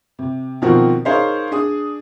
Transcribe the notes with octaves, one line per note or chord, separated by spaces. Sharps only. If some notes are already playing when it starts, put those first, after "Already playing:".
C3
B2 D#3 F3 C4 F#4 A#4
D#4 G#4 A#4 C5 C#5 F5
D4 G#4 D#6